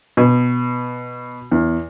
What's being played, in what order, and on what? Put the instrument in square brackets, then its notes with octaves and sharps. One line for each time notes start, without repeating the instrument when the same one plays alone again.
[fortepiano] B2
E2